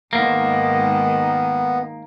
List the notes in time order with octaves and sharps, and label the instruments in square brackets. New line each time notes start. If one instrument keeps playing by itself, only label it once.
[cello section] G#2 D#3 [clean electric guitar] A#3 [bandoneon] B3